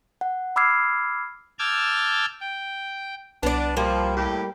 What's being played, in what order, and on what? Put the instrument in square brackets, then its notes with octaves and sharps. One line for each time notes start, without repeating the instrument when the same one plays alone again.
[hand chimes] F#5
B5 D6 E6 F6 G#6 C7
[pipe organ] A5 D6 E6 F6 G6 G#6
G5
[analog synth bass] C2 [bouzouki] B3 D5 [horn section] D4
[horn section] F3 [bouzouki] G3 A#3
[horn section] A2 G4